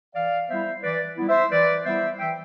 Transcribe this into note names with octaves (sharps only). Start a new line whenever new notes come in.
E3 D5 F5
G3 B3 E4 C5 E5
E3 B4 D5
G3 B3 E4
C5 E5
E3 B4 D5
G3 B3 E4 C5 E5
E3 E5 G5